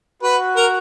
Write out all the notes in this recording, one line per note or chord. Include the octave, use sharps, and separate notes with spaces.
F#4 B4
A#4